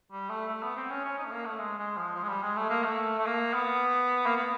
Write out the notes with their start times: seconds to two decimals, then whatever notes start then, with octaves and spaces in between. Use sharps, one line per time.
0.12 G3
0.29 A3
0.48 A3
0.63 B3
0.76 C4
0.90 C#4
1.04 C#4
1.18 D#4
1.25 A3
1.31 A#3
1.45 A3
1.59 G#3
1.79 G#3
1.97 F3
2.15 F3
2.23 G#3
2.29 G3
2.42 G#3
2.57 A3
2.70 A#3
2.84 A3
3.18 A3
3.26 A#3
3.54 B3
4.26 A#3
4.36 B3